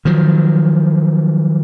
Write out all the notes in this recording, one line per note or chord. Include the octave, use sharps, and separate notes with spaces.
D#3 F3 F#3